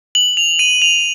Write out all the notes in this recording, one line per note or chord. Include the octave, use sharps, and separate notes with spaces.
F#7
F7
D#7
F7